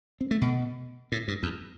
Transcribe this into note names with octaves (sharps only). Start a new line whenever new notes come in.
C4
A3
B2
A2
G2
E2